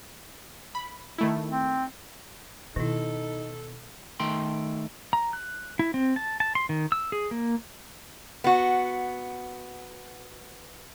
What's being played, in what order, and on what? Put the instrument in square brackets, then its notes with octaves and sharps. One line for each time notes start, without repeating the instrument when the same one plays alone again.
[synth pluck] B5
D#3 A3 E4
[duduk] C4
[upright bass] B2 [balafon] D#3 E4 [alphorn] D#4 [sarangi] A4
[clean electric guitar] D#3 A3 G5 C6
[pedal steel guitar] A#5
F#6
E4
C4
A5
A5
C6
D#3
E6
G#4
A#3
[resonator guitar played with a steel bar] B3 F#4